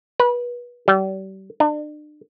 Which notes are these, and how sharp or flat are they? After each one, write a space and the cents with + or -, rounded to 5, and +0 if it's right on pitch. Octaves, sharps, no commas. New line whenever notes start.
B4 -25
G3 -35
D4 +40